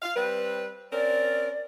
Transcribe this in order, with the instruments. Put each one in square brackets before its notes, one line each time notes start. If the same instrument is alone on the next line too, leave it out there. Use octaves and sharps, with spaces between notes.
[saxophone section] F5
G3 C4 B4
[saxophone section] C4 C#4 A#4 [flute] D5